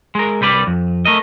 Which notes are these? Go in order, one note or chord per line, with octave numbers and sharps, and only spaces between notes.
G#3 A#4
C2 G3 B4 D5
F2
A3 A#4 D#5